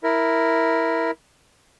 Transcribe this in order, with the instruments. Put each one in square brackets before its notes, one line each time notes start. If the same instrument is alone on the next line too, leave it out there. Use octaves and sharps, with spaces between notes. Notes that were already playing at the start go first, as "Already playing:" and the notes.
[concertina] E4 A#4